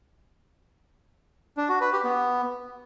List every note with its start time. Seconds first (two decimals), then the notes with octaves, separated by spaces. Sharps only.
1.57 D4
1.69 F#4
1.81 B4
1.92 G4
2.04 B3